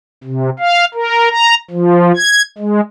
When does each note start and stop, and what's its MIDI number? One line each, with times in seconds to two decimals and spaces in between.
0.24 0.50 48
0.59 0.85 77
0.94 1.29 70
1.30 1.55 82
1.71 2.12 53
2.16 2.42 92
2.58 2.80 56